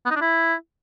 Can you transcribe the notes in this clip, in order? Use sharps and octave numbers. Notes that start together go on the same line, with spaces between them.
B3
D#4
D4
E4